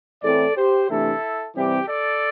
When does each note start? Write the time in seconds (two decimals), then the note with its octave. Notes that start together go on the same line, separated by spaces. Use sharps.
0.22 A2 E3 C4 A4 D5
0.56 G4 C5
0.89 C3 E3 A3 D4 E4 A4
1.55 C3 E3 G3 C4 G4
1.88 A4 D5